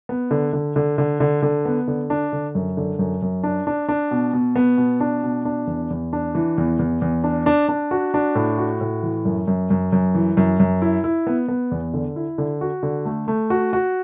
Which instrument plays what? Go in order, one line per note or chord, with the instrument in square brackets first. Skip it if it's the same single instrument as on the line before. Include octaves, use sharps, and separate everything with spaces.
[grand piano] B3
D3
D3
D3
D3
D3
D3
B3
D3
D4
D3
F#2
D3
F#2
F#2
D4
D4
D4
B2
B2
B3
B2
D4
B2
D4
E2
E2
D4
E3
E2
E2
E2
D4
D4
D4
F#4
D4
A2
F#4
A2
E3
F#2
F#2
F#2
F#2
E3
F#2
F#2
E4
E4
B3
B3
E2
D3
E4
D3
F#4
D3
A3
A3
F#4
F#4